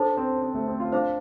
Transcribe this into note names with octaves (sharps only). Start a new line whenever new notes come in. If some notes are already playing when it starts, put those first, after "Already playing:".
Already playing: D4 A4 C5 A5
C4
C4
A3
C4
F4
D4 C5 F5 D6